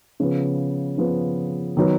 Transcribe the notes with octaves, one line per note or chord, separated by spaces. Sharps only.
C#3 F3 B3
C#3 F3 B3
D#3 F#3 B3